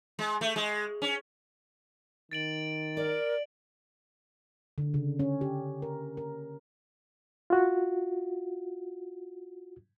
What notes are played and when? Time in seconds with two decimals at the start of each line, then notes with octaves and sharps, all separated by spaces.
0.19 G#3
0.41 A3
0.56 G#3
1.02 C#4
2.31 D#3 A6 D7 F#7
2.97 A#4 D5
4.78 D3
4.94 C#3
5.19 C#4
5.41 G4
5.82 A#4
6.17 A#4
7.50 F4 F#4